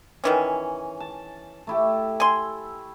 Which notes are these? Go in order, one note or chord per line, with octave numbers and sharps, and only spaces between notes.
D#3 E3 C#4
A5
A3 E4 G4
G#5 C6